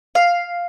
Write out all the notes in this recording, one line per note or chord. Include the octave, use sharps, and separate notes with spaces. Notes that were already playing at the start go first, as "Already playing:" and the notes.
F5